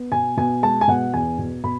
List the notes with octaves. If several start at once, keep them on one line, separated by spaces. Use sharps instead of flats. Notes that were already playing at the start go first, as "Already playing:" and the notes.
Already playing: B3
B2 G#5
B2 G#5
G#3 A5
G#5
B2 F#5
E2 G#5
B2
B2 B5